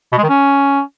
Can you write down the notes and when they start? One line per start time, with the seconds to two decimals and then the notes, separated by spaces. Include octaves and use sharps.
0.12 B2
0.18 G#3
0.23 D#3
0.29 C#4